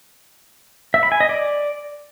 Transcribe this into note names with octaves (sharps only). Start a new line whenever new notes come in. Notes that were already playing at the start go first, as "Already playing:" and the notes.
E5
B5
G#5
D#5
D5